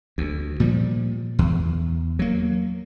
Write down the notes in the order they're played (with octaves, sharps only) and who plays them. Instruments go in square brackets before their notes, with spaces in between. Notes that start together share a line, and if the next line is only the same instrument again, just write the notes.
[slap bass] D2
A#2 F3 G3
E2
F#3 A#3